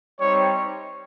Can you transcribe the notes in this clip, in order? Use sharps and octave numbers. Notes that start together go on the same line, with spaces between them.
G3 C4 D#4 C#5